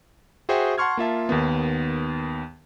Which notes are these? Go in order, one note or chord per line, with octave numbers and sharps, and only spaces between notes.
F#4 G#4 C5 E5 G5
F#5 A5 C6 C#6 F6 G#6
A#3 F4 E5 A5
D#2 D#3 B3